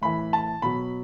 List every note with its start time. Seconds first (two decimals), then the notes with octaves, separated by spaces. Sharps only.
0.01 A2 E3 B5
0.33 A5
0.62 B2 F#3 B5